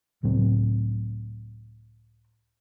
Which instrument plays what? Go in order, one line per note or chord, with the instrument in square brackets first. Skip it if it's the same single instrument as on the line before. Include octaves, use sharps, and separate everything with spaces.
[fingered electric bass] C#2 A2 F#3 C4